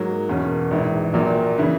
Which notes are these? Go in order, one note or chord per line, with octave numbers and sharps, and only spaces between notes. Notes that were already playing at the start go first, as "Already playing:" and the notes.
Already playing: G#2 F#3 A#3
E2 B2 A#3 C#4
A#1 G#2 E3
A#1 A#2 F#3 A#3
C#3 E3 A#3 E4